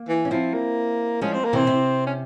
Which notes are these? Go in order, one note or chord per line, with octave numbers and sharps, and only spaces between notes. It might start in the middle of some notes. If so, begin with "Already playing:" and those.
Already playing: A#3
E3
C#4
F3 C4 E4
A#3
F3 G#3 C#4
C4
A#3
C3 E3 C4
C3
C#4